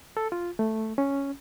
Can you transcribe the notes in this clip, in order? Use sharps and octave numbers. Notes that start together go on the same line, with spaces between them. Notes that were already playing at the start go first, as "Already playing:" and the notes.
A4
F4
A3
C#4